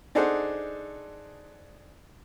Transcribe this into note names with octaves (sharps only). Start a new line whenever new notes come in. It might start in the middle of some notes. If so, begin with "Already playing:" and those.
D4 D#4 G#4 A4 C5 F#5